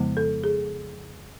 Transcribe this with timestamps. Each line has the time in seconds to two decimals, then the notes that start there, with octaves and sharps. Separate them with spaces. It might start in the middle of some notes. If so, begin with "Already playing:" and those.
Already playing: F2 C#3 F3 G#3 B3
0.17 A4
0.44 G#4